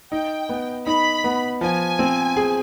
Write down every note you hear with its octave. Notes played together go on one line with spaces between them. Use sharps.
D#4 G5
B3
D#4 B5
B3
F3 G#5
C4
G#4